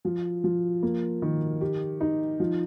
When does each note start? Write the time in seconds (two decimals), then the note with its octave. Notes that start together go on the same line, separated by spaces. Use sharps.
0.05 F3
0.44 F3
0.83 A#3
1.22 D#3
1.61 G4
2.01 D#4
2.40 F3